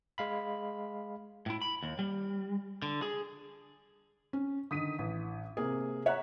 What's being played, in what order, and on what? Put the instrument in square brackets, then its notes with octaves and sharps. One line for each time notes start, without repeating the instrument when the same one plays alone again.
[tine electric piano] G#3 F5 B5
[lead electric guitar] A2 E4
B5
D#2
G3
D3
G#4
[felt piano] C#4
[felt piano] D3 D#3 [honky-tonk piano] D#6 B6 D#7
[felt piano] A1
C3 A#3 G#4
[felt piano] C#5 F#6 [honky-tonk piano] E5 F#5 A#5